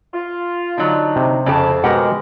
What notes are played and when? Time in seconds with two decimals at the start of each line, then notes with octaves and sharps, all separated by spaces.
0.13 F4
0.78 D3 F#3 D#4
1.16 C3
1.46 F2 C#3 G4 A5
1.84 B2 G#3 G4 A#4 F#5